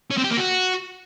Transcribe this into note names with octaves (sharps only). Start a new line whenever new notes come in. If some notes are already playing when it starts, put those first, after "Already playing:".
C#4
C4
G4
A#3
F#4